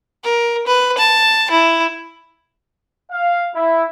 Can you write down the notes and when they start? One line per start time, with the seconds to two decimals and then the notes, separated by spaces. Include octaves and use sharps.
0.24 A#4
0.67 B4
0.98 A5
1.51 E4
3.11 F5
3.55 E4